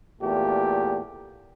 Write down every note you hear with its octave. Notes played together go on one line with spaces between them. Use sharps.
E2 A#2 A3 G4